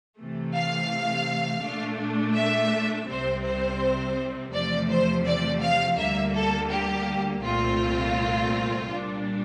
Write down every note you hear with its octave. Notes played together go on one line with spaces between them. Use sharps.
C3 E3 A3
F5
A#2 A3 D4
E5
C2 C3 G3 C4 C5
C5
E2 C3 F3 A3 D5
C5
D5
F5
D2 D3 G3 A#3 E5
A4
G4
C2 A#2 A3 C4 F4
A#2 G3 D4